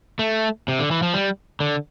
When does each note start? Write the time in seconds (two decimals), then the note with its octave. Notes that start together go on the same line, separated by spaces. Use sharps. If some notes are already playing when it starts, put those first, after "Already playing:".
0.19 A3
0.68 C3
0.79 D3
0.91 E3
1.02 F3
1.14 G3
1.60 D3